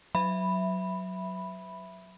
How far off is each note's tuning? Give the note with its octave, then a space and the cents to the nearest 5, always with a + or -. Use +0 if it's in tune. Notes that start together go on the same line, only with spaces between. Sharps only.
F#3 +0 E5 +5 B5 +0